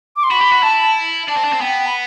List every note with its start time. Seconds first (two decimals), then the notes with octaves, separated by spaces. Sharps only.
0.16 D6
0.23 C6
0.31 F#4 B5
0.41 G4
0.52 F#4
0.63 E4 A5
1.28 D4 A5
1.37 C4
1.44 D4
1.53 C4
1.61 B3 G5
1.87 B5